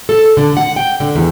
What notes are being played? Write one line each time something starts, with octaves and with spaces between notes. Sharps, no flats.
A4
D3
F#5
G5
D3
E2